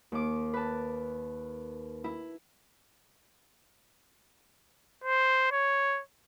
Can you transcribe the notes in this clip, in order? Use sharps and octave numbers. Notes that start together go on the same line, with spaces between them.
D#2 D6
B4 A5
E4
C5
C#5